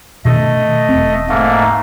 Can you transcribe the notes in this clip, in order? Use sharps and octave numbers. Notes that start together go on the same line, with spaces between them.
B2 D#3 A3 D4 D#5
E1 C4
G#2 A3 A#3